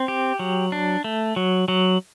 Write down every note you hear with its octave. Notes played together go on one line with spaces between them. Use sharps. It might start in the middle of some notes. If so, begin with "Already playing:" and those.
Already playing: C4
G4
F#3
D4
A3
F#3
F#3